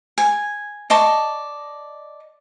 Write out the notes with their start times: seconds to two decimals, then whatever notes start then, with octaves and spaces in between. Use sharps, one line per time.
0.18 G#5
0.90 D5 D#5 A5 C#6